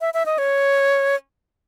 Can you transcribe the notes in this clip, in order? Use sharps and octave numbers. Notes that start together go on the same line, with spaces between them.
E5
E5
D#5
C#5